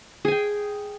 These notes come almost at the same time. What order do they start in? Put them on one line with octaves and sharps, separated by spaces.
G#4 G#5 G5